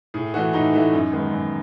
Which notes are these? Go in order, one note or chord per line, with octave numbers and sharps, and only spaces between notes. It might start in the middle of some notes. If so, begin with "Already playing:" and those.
A2 G#4
E3 A3 F#4
A2 D#4
E3 A3
F#2
D#3 G#3 B3
F#2